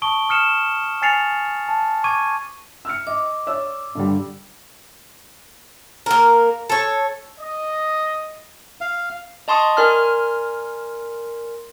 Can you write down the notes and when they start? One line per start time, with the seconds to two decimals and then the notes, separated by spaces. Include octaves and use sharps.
0.02 A5 C#6 D#6 D7 G7
0.29 D#6 F6 C#7 E7
1.02 G#5 F6 A6 C7 C#7 F7
1.69 A5
2.04 C#6 D6 G#6 D#7
2.85 E6 F6 C#7
3.07 D#5 D6
3.47 C#5 D5 E6
3.95 G2 D3 G3
6.06 A#3 A#4
6.70 A4 C#5
7.40 D#5
8.81 F5
9.48 D#5 A5 C6 C#6 D#6
9.77 A#4 D5 G#5 C6 F6